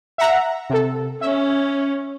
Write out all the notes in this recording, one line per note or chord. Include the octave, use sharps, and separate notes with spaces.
E5 F#5 A#5
C3 A4
C#4 E5